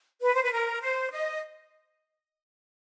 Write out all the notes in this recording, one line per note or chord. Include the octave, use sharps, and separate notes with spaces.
B4
C5
B4
A#4
C5
D#5